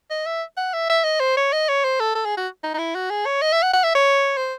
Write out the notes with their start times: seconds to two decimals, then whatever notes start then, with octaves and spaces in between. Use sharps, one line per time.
0.10 D#5
0.26 E5
0.57 F#5
0.74 E5
0.90 E5
1.04 D#5
1.20 C5
1.37 C#5
1.53 D#5
1.69 C#5
1.84 C5
2.00 A4
2.15 A4
2.25 G#4
2.37 F#4
2.63 D#4
2.74 D#4
2.78 E4
2.95 F#4
3.10 G#4
3.26 C#5
3.42 D#5
3.52 E5
3.63 F#5
3.73 F#5
3.84 E5
3.95 C#5
4.37 C5